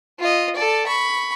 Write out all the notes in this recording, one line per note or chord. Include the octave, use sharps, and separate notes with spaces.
F4 D#5
A4 D5
B5 C#6